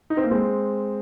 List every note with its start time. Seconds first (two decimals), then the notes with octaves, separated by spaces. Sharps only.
0.10 D#4
0.17 C4
0.24 A#3
0.31 G#3 C4